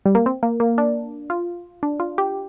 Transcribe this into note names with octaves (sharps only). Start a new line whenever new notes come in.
G3
A#3
C4
A#3
A#3
D4
F4
D4
F4
G4